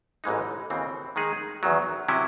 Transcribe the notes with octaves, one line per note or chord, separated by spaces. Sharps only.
A1 G#2 E3 G#3 D#4
D#2 C#3 E3 C4 F#4
D#3 G#3 D#4 G#4
E2 D#3 F#3
C3 F#3 C#4 E4